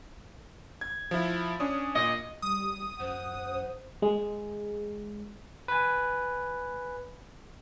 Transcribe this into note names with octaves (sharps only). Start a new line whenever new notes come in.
G#6
F3 E4
C#4 D4 D#6
A#2 D#5
G3 D#6
F#2 C5 F#5
G#3
B4 G#5